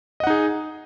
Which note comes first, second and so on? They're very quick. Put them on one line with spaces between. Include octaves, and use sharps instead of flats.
D#5 F#5 D#4 G#4